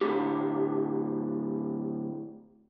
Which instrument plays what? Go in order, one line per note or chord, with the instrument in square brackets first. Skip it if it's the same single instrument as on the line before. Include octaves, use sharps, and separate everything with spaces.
[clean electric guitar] D2 A2 D3 E3 F#3 G4